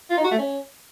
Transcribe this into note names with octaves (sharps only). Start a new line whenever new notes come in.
F4
D#4
F#4
A3
C#4